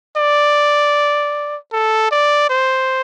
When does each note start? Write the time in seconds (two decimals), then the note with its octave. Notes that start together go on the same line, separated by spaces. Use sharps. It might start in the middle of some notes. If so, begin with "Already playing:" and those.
0.17 D5
1.72 A4
2.11 D5
2.50 C5